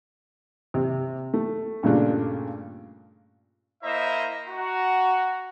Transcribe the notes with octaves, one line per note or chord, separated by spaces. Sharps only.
C3
A3
G2 A#2 C#3 A3 D4 F4
A#3 E4 C5 D#5 E5 A#5
F#4 F#5 A#5